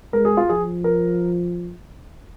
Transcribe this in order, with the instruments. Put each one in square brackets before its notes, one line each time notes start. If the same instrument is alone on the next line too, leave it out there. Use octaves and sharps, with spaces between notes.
[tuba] G#3 [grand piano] A#4
[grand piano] G#4
F4
[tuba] F3 [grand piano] G#4
[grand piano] A#4